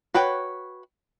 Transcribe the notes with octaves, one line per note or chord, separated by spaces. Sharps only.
F#4 B4 C#5 G5